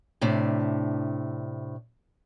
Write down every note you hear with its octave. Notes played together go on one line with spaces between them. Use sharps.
A2 C3 D4